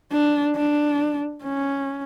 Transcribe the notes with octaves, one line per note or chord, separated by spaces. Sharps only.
D4
D4
C#4